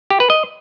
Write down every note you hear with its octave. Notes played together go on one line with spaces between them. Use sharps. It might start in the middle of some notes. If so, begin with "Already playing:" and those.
G4
B4
D#5